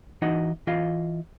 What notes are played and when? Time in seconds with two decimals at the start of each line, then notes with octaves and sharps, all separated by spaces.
0.22 E3 D#4 F#4 D#5 F#5
0.67 E3 F4 D#5 F5